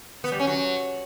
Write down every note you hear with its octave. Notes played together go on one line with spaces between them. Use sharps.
B3
G3
C#4
F#3